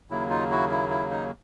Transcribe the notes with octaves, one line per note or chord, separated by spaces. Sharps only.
D#2 C#3 F#3 A#3 E4
D#4 F4
E4 F#4
E4
E4
D#4